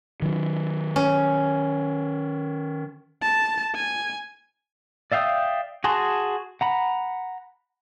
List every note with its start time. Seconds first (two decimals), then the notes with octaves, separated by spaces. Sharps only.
0.22 D#3 F#3
0.96 C#4
3.22 A5
3.75 G#5
5.12 D5 E5 F5 G5 D#6
5.84 F#4 G#4 G#5 A5 C6
6.61 F#5 A#5 B5